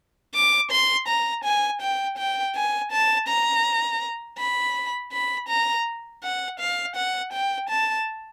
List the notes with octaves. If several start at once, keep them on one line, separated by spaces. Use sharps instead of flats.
D6
C6
A#5
G#5
G5
G5
G#5
A5
A#5
B5
B5
A#5
F#5
F5
F#5
G5
A5